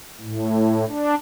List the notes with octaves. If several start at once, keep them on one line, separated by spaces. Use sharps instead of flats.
A2
D4